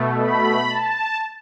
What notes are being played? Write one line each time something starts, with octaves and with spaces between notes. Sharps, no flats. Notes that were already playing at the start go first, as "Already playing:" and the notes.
Already playing: B2 A3
B5
A5